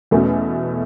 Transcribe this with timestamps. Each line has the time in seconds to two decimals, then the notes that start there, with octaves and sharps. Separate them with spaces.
0.11 E2 B2 A3 C#4 F#4